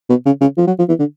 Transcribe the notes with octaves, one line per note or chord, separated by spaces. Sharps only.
B2
C#3
C#3
F3
F#3
F3
E3
D3